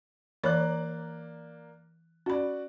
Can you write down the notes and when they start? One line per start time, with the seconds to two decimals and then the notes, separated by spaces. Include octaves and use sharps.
0.43 E3 A#3 C#5 D5 B5 F#6
2.26 C#4 F#4 D5 B5